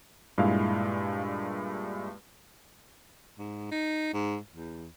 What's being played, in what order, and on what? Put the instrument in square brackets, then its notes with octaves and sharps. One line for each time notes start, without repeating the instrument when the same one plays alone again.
[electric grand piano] G2 A#2 G#3 E4 F5
[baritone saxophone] G#2
D#4
G#2
E2